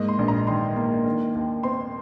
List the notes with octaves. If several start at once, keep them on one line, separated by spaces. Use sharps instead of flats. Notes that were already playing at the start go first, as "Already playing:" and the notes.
Already playing: G#2 A#3 D#5
C6
A#1
A#5
D#3 C6
A#3
D#3
D#2
C4 C6